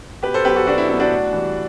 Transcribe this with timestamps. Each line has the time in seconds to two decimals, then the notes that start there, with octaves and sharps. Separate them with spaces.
0.22 B2 G4 B4
0.34 A4 C5
0.45 F#3 B3 G4 B4
0.56 F#4 A4
0.67 B2 D4 F#4
0.78 E4
0.89 F#3 B3 E4
1.00 D4 F#4
1.11 A2
1.33 E3 G3